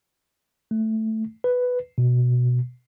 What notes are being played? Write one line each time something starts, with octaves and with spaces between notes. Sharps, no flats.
A3
B4
B2